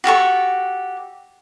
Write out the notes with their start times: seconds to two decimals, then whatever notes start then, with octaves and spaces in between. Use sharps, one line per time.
0.04 F#4 G4 A4 C#6